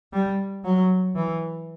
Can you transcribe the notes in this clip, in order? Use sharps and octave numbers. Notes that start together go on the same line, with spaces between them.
G3
F#3
E3